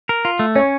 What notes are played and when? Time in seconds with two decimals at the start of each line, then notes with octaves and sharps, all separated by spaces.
0.09 A#4
0.25 F4
0.39 A3
0.56 C#4 C#5